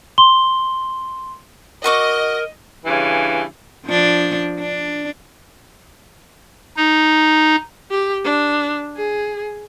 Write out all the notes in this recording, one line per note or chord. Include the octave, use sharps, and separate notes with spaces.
C6 G7
F#4 A#4 D#5 C#6 D6
G2 C#3 E3
F3 D4
D4
D#4
G4
D4
G#4